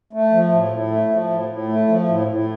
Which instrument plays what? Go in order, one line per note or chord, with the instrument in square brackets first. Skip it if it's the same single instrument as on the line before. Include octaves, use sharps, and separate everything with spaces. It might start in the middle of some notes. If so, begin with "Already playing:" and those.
[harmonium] A3
F3
A2
A2
A3
F3
A2
A2
A3
F3
A2
A2